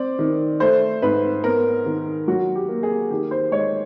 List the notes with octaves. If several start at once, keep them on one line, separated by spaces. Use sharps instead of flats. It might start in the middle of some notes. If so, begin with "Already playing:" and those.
Already playing: C4 D5
D#3
A3 C5
G#2 B4
B3 A#4
D#3
F#3 F#4
G4
A#3
G#4
D#3 G4
C5
G#3 C#5